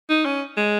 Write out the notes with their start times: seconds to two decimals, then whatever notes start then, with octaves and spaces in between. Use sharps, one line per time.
0.10 D#4
0.25 C#4
0.57 G#3